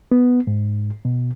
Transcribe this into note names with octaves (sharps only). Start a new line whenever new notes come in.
B3
G#2
B2